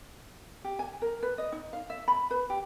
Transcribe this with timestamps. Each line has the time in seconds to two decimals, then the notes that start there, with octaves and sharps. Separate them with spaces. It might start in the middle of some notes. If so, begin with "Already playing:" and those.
0.64 G4
0.79 G#5
1.02 A#4
1.23 B4
1.38 D#5
1.52 D#4
1.73 F5
1.90 E5
2.08 B5
2.31 B4
2.50 G4